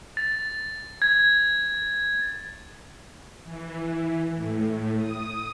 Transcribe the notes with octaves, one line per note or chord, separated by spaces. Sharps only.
A6
G#6
E3
A2
D#6